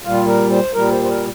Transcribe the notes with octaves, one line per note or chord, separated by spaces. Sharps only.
A#2 G3 F4
A#4
C5
A#2 G3 A#4
C5
C5
A#4